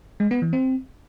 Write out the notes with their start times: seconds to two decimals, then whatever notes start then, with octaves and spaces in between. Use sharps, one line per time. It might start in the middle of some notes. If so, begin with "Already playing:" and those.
0.20 G#3
0.31 B3
0.42 E3
0.53 C4